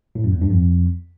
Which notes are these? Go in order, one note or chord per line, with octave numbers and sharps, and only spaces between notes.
A2
F#2
E2
G2
F2